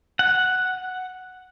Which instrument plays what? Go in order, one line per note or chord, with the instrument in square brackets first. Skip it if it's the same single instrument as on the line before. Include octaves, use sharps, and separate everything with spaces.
[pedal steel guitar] F#5